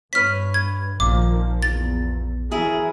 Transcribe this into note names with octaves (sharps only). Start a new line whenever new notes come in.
G2 B4 C#5 F6 B6
G#6
A#1 A#2 D#3 F3 A#3 D6
E2 A6
E3 F#3 E4 G#4 A#4